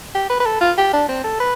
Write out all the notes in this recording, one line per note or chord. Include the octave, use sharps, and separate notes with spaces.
G4
B4
B4
A4
F4
G4
D4
C4
A4
B4